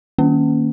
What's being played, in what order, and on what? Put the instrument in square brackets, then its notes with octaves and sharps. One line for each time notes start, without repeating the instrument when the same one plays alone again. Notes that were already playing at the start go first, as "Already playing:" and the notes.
[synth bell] D#3 A#3 C#4